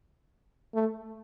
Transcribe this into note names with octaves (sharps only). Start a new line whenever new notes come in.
A3